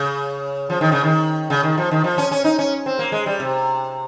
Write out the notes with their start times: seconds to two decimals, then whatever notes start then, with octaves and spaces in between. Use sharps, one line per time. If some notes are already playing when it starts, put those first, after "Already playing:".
Already playing: C#3
0.70 F3
0.81 D#3
0.92 C#3
1.04 D#3
1.50 C#3
1.63 D#3
1.78 F3
1.91 D#3
2.04 F3
2.18 C#4
2.31 C#4
2.44 D#4
2.59 C#4
2.86 C4
2.99 A#3
3.12 G#3
3.26 G3
3.40 C3